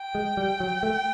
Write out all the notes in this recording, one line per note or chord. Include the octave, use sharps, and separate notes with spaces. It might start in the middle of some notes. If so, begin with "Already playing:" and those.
Already playing: G5
G#3
G3
F#3
A3